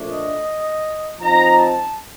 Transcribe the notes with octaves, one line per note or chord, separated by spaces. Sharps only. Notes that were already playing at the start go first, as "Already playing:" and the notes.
Already playing: A#2 F3 A3 D4
D#5
F3 C4 D#4 A#5
A5